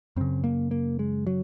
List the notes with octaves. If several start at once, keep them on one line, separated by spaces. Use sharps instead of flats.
F#2 C#3 C4
A#3
A#3
G#3
F#3